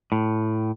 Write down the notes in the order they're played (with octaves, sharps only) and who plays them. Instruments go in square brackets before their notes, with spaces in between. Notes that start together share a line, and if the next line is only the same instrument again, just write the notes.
[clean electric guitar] A2